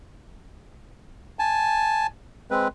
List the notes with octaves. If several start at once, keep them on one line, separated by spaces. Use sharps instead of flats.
G#5 A5
G#3 C4 B4